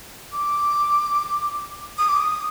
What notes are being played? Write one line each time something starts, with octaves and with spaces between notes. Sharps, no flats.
D6
D#6
D6
D#6